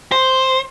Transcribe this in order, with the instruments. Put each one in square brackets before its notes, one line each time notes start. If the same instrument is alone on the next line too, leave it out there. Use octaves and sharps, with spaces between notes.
[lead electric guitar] C5